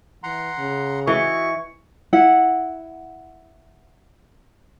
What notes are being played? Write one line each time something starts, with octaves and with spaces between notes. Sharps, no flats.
E3 F#5 A#5 C6
C#3
E3 F#4 D#5 E5 C#6
E4 F#5